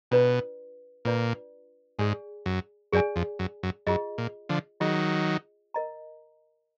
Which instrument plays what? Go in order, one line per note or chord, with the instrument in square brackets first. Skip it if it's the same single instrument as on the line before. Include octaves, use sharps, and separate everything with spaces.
[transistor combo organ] B2 [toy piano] D4 F4 B4 D5
[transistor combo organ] A#2 [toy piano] D4 F4 B4 D5
[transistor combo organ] G#2 [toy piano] G#4 D5 G#5
[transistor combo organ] F#2
[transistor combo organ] F#2 [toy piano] G#4 D5 G#5
[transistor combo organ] F2
F#2
F#2
[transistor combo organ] F#2 [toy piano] F4 G#4 D#5
[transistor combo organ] A#2
D3 F3
[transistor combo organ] D#3 F#3 [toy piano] F4 G#4 D#5
[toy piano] A#4 D#5 A#5